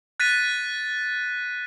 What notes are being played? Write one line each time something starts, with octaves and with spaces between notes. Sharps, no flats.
F#6 A6 B6 D#7